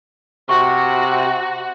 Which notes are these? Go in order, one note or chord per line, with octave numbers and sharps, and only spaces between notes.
C3 F#4 C#6